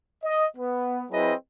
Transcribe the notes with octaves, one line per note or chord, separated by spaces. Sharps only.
D#5
B3
F#3 C4 E4 G#4 B4 D#5